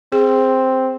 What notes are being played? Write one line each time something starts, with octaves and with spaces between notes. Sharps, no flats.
C4 G#4